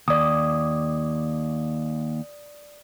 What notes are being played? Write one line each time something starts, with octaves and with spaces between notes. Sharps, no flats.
D#2 D5 D#6